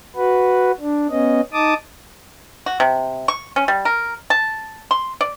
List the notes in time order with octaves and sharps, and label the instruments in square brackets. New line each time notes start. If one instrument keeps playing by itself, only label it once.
[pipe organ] F#4 B4
D4
B3 C#4 D#5
D#4 A5 D6 D#6
[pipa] F#4
C3
C#6
C#4
G3
A#4
A5
C6
D5